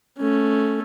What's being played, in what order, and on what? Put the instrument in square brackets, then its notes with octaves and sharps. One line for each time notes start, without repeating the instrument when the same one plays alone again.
[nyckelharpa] A3 C#4